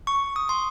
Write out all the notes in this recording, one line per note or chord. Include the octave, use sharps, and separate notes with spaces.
C#6
D#6
C6